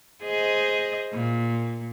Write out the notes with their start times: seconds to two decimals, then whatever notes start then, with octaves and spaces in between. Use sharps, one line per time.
0.22 G#4 C5 D#5
1.13 A#2